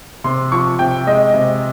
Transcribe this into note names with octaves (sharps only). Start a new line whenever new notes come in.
C3 C6
F3 C#6
C3 G5
G#3 D#5
C3